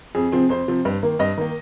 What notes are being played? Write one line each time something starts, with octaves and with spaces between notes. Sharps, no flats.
F2 G#4
C3 F3 C4
F2 C5
C3 F3 C4
G2
D#3 A#3
G2 D#5
D#3 A#3